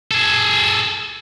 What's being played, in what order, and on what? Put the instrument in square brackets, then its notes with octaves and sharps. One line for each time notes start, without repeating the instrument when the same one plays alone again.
[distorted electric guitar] G#4 A4